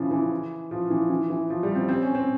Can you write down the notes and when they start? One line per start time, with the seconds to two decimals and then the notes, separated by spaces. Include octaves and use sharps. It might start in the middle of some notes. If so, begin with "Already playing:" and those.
Already playing: C#3 E3 F3
0.11 E3
0.71 F3
0.90 E3
1.10 E3
1.30 E3
1.50 F3
1.63 G3
1.75 C4
1.89 C4
2.02 C#4
2.15 C4